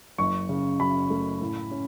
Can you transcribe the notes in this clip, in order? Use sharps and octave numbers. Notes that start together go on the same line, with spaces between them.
F#1 C#6
C#3
F#2 B5
A3
A2
C#4